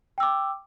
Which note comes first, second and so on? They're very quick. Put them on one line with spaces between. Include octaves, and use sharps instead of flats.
G5 E6 D6